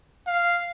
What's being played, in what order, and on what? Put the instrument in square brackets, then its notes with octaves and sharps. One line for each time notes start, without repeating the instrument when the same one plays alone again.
[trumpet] F5